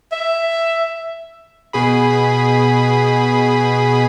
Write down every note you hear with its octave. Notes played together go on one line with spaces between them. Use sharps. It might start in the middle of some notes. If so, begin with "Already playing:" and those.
E5
B2 G#4 B5